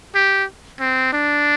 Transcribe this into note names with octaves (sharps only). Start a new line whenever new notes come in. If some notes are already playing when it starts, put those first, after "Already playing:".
G4
C4
D4